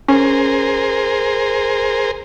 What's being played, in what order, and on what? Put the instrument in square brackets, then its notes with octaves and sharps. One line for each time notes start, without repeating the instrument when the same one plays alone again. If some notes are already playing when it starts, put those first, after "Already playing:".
[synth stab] C#4 [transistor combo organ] G#4 A#4 C5